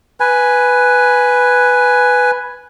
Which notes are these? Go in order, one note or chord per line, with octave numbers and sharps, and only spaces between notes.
B4 G#5